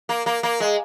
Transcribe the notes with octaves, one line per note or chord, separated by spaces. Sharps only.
A#3
A#3
A#3
G#3